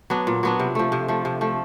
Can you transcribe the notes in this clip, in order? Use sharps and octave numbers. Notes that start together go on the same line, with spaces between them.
F#3 B3 D4
A#2
F#3 B3 D4
C3
F3 A3
C3
F3 A3
C3
F3 A3